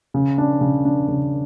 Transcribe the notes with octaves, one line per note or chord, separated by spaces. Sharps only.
C#3
D4
C#3
D4
C#3